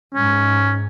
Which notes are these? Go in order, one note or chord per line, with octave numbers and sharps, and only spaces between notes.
G#2 C#4